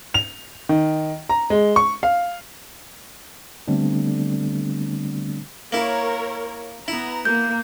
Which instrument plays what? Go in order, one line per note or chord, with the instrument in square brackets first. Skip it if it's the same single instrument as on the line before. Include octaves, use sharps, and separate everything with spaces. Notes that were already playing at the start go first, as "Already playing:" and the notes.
[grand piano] F7
D#3
A#5
G#3
C#6
F5
[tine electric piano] D3 G3 A3 B3 C4 D4
[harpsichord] A#3 E4 [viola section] A#4 C#5
[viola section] B3 A#5 [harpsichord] E4
[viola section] A#3 [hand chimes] G6